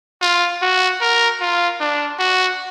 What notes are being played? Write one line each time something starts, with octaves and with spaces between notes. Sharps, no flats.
F4
F#4
A#4
F4
D4
F#4